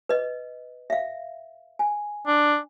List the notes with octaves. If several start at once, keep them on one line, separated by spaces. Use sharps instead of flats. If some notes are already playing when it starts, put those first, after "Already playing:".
B4 D#5
E5 F5
G#5
D4